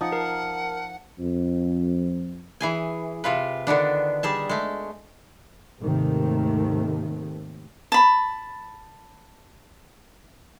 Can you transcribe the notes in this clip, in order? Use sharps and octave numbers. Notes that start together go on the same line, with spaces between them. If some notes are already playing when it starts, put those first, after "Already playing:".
F3 D#4 D#5 F#5
A#4 A5
F2
E3 G#4 G#5
C3 F4 B4
D3 D#3 B3 D4
G3 G#4 A5
G#3 A3
D#2 G#2 C3 D#3 A3
A5 B5